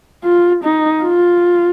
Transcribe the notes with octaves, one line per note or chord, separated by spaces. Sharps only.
F4
D#4
F4